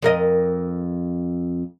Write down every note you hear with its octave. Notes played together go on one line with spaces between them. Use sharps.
F2 A#4 D#5